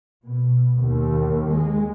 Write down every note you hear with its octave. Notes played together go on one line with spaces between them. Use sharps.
B2
D#2
G#3